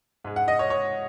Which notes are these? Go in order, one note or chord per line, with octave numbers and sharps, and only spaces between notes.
G#2 G#3
F#5
D#5
C#5
C#5